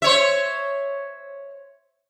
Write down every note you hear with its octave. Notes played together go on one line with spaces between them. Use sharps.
C5 C#5 E5